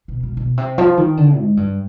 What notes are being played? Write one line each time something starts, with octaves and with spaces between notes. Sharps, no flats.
B2
B2
B2
C3
F3
D#3
D3
G#2
G2